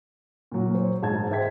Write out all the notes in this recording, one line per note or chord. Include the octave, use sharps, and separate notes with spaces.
A#2 F#3
C5 C#5
G#2 A5 G#6
C5 E5 G5 G#6 B6